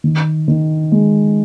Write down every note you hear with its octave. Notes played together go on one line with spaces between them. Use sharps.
D#3
D#3
G#3